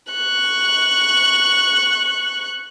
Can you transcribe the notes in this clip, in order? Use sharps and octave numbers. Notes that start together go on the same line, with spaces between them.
C#6 F#6